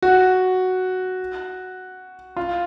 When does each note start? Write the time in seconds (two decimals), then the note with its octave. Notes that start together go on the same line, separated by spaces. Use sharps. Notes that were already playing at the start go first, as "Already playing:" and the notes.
0.02 F#4
2.37 F4